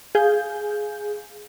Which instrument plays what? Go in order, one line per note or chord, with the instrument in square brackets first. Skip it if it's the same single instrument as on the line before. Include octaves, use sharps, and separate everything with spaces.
[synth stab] G#4 F5 G#5 G6